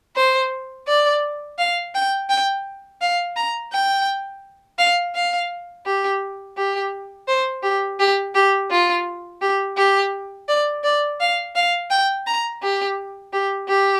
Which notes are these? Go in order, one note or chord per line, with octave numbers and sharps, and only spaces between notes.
C5
D5
F5
G5
G5
F5
A#5
G5
F5
F5
G4
G4
C5
G4
G4
G4
F4
G4
G4
D5
D5
F5
F5
G5
A#5
G4
G4
G4